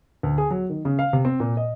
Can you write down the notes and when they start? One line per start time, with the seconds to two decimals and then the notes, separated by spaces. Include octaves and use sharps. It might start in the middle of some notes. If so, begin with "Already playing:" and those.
0.23 D2
0.38 G#4
0.51 F#3
0.69 D#3
0.85 C#3
0.99 F5
1.13 C3
1.25 C4
1.40 A#2
1.57 D#5